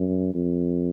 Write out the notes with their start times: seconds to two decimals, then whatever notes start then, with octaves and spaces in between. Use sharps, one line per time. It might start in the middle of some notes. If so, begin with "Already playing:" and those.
Already playing: F#2
0.34 F2